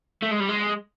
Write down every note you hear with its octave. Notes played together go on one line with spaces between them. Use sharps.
A3
G#3
G3
G#3